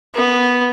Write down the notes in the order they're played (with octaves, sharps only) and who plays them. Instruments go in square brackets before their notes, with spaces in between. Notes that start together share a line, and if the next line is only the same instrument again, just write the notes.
[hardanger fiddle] B3